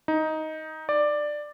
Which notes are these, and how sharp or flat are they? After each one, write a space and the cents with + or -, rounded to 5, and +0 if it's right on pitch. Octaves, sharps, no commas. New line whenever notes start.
D#4 +10
D5 +10